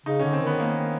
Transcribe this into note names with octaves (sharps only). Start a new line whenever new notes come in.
C#3 D#4
D3 C#4
C4
D#3 B3
A#3